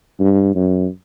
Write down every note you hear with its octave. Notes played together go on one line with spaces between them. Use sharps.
G2
F#2